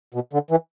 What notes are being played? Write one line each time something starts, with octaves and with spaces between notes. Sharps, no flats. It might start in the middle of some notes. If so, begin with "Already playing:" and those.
B2
D3
E3